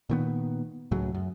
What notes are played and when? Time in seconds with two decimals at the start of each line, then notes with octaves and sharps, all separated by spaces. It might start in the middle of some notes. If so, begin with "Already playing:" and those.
0.10 A#2 D#3 B3
0.91 C#2 A2 C#3 F#3
1.14 F#2